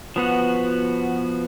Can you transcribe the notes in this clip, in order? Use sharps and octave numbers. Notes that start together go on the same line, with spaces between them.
F3 B3 F#4